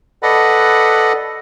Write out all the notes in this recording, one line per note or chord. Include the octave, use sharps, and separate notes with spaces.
A4 B4 D5 D#5 F#5 B5